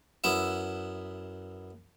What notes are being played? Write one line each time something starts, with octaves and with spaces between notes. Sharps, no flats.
F#2 B3 E4 E5